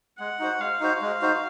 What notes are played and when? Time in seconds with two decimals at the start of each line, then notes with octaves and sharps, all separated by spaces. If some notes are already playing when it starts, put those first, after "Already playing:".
0.19 G#3 F#5
0.39 D#4 F#4 C5
0.60 G#3 F5
0.80 D#4 F#4 C5
1.02 G#3
1.22 D#4 F#4 C5